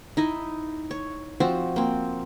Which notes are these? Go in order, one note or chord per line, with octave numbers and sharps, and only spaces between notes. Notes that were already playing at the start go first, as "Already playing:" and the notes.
D#4 E4 D#5
C#5
F3 C4 F#4
A#3 C4